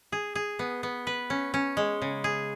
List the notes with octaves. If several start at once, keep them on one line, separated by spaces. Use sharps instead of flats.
G#4
G#4
B3
B3
B4
C#4
C#4
G#3
C#3
G#4